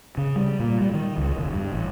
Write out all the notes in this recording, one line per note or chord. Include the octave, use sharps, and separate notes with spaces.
C#3
G3
A#2
G3
D#3
C#2
E1
G2
A1